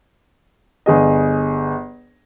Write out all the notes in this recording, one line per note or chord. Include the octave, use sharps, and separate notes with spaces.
G1 G#4 D#5